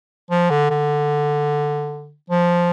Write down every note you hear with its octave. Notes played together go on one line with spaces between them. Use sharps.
F3
D3
D3
F3